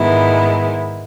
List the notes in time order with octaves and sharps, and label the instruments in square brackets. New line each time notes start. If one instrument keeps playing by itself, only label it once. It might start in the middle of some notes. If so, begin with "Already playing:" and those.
Already playing: [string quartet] G#2 D#3 G#3 B3 E4